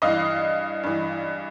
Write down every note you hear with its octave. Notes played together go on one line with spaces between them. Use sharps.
G2 E3 D#5 F5
G2 E3